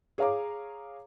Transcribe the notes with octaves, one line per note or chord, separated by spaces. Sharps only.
G#4 C#5 F5 A#5 D6